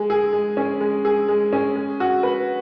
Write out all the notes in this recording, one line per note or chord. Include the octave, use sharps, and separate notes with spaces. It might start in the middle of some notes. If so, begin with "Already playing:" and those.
Already playing: G#3
G#4
G#3
C#4
G#3
G#4
G#3
C#4
G#3
F#4
B4